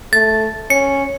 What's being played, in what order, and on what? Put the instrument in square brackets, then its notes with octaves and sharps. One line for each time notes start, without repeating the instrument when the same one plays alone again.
[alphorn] A3 [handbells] A6
[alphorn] C#4 [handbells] C#7